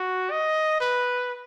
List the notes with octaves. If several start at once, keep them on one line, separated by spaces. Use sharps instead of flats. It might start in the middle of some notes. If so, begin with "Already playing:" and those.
Already playing: F#4
D#5
B4